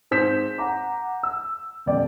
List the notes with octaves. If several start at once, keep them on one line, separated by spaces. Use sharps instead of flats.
G#2 C4 G6 B6 E7
F#5 A#5 D6
E6
E1 F#2 D5 G5